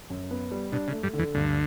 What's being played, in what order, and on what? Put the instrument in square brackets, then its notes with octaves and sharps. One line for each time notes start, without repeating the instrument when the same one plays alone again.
[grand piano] F#2
B3
G3
[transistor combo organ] B2 [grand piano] D4
[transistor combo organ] C#3
[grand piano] A3
[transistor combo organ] G2 G3
[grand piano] D3
[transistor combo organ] E2 E3
[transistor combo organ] D2 D3 [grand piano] G2